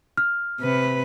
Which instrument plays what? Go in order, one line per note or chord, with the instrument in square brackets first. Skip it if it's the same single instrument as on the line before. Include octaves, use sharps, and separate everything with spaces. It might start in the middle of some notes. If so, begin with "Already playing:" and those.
[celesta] F6
[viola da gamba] C3 B4